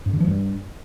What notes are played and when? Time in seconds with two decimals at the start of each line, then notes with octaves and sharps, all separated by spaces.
0.06 G2
0.13 D3
0.20 F3
0.27 G2